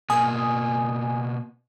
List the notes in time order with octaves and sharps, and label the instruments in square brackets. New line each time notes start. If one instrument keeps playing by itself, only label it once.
[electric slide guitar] B2 A#3 [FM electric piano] G#5 D#6